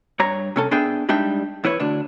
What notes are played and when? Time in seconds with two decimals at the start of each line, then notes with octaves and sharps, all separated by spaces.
0.19 G2 C#5 A#5
0.56 C3 C#4 A4
0.71 B3 D4 G#4 E5 G5
1.09 G3 G#3 D4 D#4 E5 G5
1.64 E2 E4 B4 C#5
1.80 D2 D4